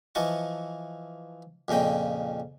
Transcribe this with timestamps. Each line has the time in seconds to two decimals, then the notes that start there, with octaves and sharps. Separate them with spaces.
0.15 E3 F3 D#5 A5 C#6
1.68 F2 A#2 C#3 D#5 G5